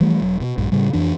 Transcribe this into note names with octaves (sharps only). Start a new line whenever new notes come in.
E3 F3 G3 A3
E1 F#3
B2
A#1 G2
A2 C#3 G3
F2 E3 D4